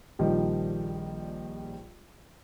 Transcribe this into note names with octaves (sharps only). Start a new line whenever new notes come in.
A#1 D#3 F3 G3